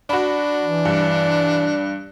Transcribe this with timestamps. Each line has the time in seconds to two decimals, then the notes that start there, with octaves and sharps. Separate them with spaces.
0.10 D4 F#4 B5
0.63 E3
0.85 G2